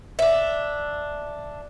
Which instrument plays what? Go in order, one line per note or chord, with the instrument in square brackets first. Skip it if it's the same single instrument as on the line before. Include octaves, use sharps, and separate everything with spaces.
[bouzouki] D4 E5